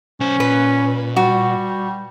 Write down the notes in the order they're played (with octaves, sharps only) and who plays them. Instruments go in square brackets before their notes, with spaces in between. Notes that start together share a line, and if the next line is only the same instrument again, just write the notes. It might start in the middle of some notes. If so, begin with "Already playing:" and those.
[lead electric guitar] B1 C5 [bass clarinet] C#4
[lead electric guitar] A#2 [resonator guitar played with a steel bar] B4
[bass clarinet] G3 [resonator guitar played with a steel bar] F#4